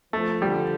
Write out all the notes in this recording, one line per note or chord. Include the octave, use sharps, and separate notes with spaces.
F3 A3
D3 G3